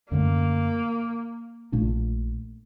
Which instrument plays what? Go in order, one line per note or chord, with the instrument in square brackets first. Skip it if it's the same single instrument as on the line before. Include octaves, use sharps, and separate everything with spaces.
[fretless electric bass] F#2 D3 A3 [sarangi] A#3
[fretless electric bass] A#1 A#2 A3 D4